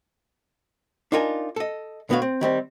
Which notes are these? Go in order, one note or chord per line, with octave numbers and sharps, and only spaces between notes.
D4 D#4 F4 A#4 G#5
A4 D#5
B1 D3 B3 F#4 C#5 F5
C4
D#3 G3 C4